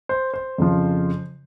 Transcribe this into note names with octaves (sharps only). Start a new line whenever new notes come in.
C5
C5
F2 C#3 F3